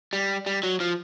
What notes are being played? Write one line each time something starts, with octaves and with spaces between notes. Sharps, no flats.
G3
G3
F#3
F3